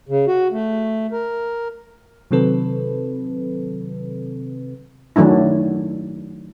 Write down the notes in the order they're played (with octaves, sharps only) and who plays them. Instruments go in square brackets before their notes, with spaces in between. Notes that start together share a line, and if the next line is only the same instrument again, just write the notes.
[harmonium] C#3
F#4
A3
A#4
[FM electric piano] C3 D#3 F#3 C4 A4 B4
[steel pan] D#3 F#3 A3 D4 E4